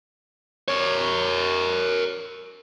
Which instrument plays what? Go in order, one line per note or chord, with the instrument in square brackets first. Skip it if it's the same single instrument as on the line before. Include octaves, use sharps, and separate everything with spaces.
[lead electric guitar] A#4 C#5